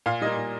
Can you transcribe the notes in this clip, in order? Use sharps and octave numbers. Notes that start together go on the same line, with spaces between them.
A#2 F5
G3 A#3 D#5
A#2